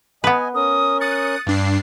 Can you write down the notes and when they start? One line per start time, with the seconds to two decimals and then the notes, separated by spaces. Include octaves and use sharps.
0.24 B3 B4 D#5 G#5
0.55 C#4 A#4 D#6
1.01 D#6 F#6 A6 C#7
1.46 G2 D4 C7